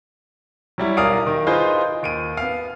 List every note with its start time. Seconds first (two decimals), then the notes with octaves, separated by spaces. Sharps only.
0.78 F#3 G3 E4
0.97 B1 A#4 D5 F5 D#6 D7
1.27 D#3
1.47 D#4 F4 G#4 B4 C5
2.03 D#2 D7 D#7
2.37 B3 F5